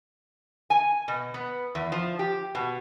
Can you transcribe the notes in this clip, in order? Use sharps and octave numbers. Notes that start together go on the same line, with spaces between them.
G#5
B2
B3
E2
F3
G4
B2